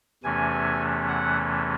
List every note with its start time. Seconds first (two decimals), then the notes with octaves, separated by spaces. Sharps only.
0.23 E2 C3 E3 A3 C#4 G#5
1.08 F#5